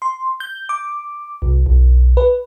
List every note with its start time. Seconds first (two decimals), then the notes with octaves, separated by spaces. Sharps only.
0.02 C6
0.40 G6
0.69 D6
1.42 C2
1.66 B1
2.17 B4